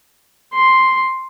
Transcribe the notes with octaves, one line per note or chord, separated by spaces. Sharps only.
C6